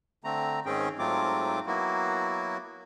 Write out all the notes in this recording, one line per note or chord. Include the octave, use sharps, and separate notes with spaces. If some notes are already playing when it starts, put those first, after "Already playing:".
D3 A3 C4 A#5
G#2 D#3 C4 C#4 G#4 G5
G#2 F#3 A3 C4 F4 D6
F#3 A#3 B3 E4 F#4